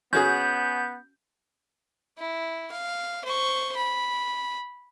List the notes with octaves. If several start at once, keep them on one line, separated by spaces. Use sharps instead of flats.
B3 C#4 F#4 G#4 G6
E4
F5
C5 C#6
B5